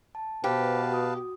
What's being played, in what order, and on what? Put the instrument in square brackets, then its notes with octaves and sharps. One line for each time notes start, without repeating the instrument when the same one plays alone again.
[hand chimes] A5
[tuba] B2 [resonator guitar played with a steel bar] G4 [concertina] B4 F5 A5 [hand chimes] C5 G5
[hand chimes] F#4 D#6